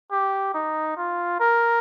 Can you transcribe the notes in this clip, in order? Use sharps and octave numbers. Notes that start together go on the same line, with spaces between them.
G4
D#4
F4
A#4